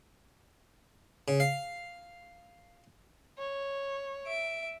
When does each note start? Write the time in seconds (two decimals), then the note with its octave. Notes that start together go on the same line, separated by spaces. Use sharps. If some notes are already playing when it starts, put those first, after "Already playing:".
1.28 C#3
1.40 F5
3.38 C#5
4.27 E5 D7